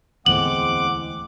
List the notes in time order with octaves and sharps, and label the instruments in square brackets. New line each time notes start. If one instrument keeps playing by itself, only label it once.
[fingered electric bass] D1 E2 A2 [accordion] G#3 C4 F#5 [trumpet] D6 [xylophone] F#7